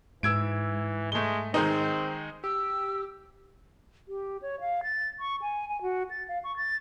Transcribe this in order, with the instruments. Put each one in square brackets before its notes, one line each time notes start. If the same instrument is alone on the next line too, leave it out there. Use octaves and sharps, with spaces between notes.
[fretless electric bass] G#2 [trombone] E3 [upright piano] E6 G#6 D7
[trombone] G#3 [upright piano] A3 G7
[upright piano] D#3 G#3 D#4 [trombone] C4
[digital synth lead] G4 [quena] E6
[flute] G4
C#5
F5
A6
C#6
G#5
G#5
F#4
A6
F5
C#6
A6